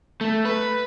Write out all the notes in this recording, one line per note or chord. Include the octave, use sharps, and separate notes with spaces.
A3
B4